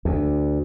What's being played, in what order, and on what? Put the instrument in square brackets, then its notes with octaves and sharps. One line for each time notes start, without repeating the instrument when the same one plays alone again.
[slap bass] D2